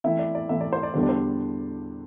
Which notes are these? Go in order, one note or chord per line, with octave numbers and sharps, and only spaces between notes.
E3 A3 C4 E4 E5
D5
D5
E3 A3 C4 E4 E5
D5
C5
D5
E2 D3 G3 D4 C5
D5
C5